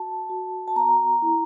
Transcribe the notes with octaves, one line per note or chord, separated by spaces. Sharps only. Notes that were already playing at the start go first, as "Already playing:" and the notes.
Already playing: F#4 A5
F#4
A5
B3 A#5
E4